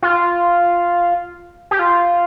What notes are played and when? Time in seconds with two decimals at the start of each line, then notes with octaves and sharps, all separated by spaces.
0.02 F4
1.71 G4
1.79 F4